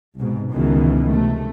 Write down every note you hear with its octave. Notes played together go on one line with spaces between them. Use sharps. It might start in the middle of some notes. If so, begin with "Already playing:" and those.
C2 G#2 B2
C#2 B2 D#3 E3
C3 A3